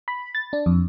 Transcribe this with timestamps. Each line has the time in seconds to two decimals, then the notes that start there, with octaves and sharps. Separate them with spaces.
0.08 B5
0.35 A6
0.53 D4
0.66 F2